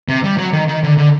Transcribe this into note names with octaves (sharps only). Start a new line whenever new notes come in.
C3
G3
F#3
D#3
D#3
D3
D3